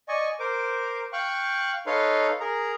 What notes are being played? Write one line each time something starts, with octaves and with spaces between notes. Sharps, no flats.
D5 D#5 G#5 C#6
A#4 C5 D6
F5 G5 C#6 F#6
D#4 A4 B4 C#5 F5 C6
G#4 A#4 A#5